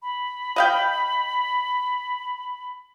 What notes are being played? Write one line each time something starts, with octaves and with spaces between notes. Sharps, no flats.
B5
D#5 F5 G5